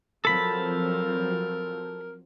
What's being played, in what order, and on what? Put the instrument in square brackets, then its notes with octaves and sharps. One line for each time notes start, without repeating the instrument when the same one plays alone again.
[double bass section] F3 F#3 C4 [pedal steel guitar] A4 B5 [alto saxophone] A#4